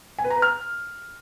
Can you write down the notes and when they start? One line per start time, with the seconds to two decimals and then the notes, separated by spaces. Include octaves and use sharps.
0.19 G#5
0.24 B4
0.30 A#5
0.36 B4
0.42 F6